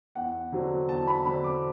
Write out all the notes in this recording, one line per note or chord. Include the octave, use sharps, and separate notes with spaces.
E2 F#5
D3 F#3 C4
E2 A5
B5
D3 F#3 C4 B5
D6